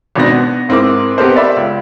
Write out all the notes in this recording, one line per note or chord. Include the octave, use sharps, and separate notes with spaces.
G#1 B2 C4 D4 A#6
B3
G#2 C4 E4 A#4 D6
B3 C4 G4 A4 A#4 C5
D5 E5 B5
C#2